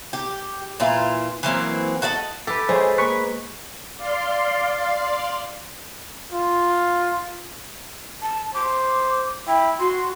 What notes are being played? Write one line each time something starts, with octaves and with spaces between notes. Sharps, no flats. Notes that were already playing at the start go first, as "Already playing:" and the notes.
G4
A#2 E3 E4 F4
E3 F#3 A#3 C4
F#4 A4 D#5 F#5
G4 A4 B4
G#3 C5 C#5
A#3 B4 C#6
D5 F5 C6
F4
A5
C5 D6
E4 G5
F#4 C6